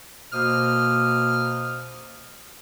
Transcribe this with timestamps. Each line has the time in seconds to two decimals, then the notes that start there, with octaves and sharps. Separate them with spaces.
0.32 B2 A#3 C5 D#6 F6